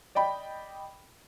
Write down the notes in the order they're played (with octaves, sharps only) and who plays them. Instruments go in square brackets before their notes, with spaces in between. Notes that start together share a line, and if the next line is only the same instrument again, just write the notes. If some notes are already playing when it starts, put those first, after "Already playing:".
[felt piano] D5 D#5 G5 B5